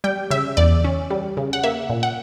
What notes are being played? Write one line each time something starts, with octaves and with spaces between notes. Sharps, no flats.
G3 G5
C#3 E5
E2 D5
C#4
G3
C#3
F#5
A#3 E5
A#2
F#5